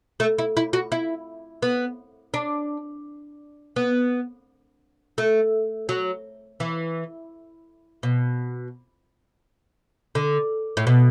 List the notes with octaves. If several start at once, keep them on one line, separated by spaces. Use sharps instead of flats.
A3
E4
E4
F#4
E4
B3
D4
B3
A3
F#3
E3
B2
D3
A2
B2